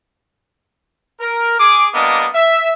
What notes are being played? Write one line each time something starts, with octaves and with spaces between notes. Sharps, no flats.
A#4
G#4 D6
G3 A#3 B3 D4 D#5
E5